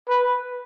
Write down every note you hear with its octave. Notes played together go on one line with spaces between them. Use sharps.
B4